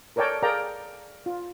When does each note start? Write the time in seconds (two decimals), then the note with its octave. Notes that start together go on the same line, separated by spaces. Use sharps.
0.16 A4 A#4 C#5 D5 G5 A5
0.43 G#4 A#4 D5 F5 G5 A#5
1.26 F4